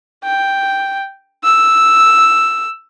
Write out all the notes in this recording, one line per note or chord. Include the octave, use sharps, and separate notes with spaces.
G5
E6